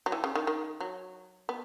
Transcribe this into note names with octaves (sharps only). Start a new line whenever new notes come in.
F#3
E3
C#3
D#3
D#3
F#3
B3